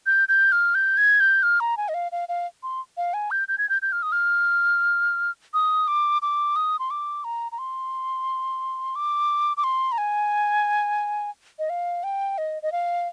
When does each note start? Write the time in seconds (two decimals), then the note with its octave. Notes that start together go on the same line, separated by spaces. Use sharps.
0.06 G6
0.28 G6
0.52 F6
0.75 G6
0.98 G#6
1.20 G6
1.43 F6
1.60 A#5
1.77 G#5
1.89 D#5
1.94 F5
2.12 F5
2.29 F5
2.63 C6
2.97 F5
3.14 G#5
3.31 G6
3.48 G6
3.58 G#6
3.69 G6
3.82 G6
3.92 F6
4.03 D#6
4.12 F6
5.54 D#6
5.88 D6
6.22 D6
6.56 D#6
6.79 C6
6.90 D6
7.24 A#5
7.52 A#5
7.59 C6
8.96 D6
9.57 D6
9.64 C6
9.92 A#5
9.98 G#5
11.59 D#5
11.70 F5
12.04 G5
12.38 D#5
12.62 D#5
12.72 F5